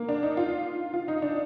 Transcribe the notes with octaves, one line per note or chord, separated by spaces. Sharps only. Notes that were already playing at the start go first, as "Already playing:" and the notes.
Already playing: A#3
D4
D#4
F4
F4
D#4
D4